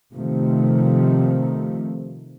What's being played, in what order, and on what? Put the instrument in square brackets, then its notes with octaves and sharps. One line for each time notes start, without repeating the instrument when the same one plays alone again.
[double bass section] C3 D#3 F3 A3